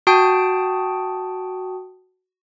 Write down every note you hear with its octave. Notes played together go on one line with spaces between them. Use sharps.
F#4 G5 A5 D#6 D7